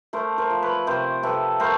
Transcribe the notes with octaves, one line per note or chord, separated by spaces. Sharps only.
A3 A#4 C5
A#4 C5
F3
B4 C#5
C3 A#4 C5
C3 A4 B4
A3 A#4 C5